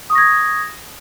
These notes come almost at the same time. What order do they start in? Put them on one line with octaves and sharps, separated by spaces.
D#6 C#6 A#6 G#6